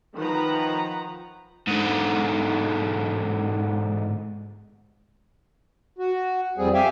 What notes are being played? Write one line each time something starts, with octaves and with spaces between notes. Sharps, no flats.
D#3 F3 B4 F#5 A#5
G#2 D3
F#4
F2 G3 C4 G#4
G4 E5 F5 G5 G#5